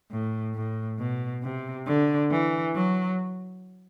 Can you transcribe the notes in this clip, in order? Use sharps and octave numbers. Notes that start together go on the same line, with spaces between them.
A2
A2
B2
C3
D3
E3
F#3